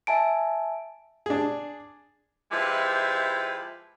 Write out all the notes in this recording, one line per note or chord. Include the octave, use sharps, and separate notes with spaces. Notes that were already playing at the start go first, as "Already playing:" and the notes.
E5 G#5 A5 D7
D4 G#4
F3 G#3 E4 G4 B4 E5